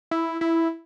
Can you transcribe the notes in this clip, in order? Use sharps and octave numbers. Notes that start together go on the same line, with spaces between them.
E4
E4